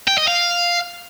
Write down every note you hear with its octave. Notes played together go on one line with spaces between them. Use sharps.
G5
D#5
F5